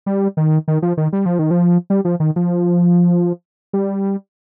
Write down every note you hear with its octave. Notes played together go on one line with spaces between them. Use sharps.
G3
D#3
D#3
F3
D#3
G3
F3
D#3
F3
G3
F3
D#3
F3
G3